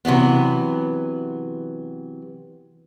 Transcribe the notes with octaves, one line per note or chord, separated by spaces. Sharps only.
C3 E3 F#3 B3